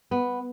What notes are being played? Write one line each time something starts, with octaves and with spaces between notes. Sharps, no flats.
B3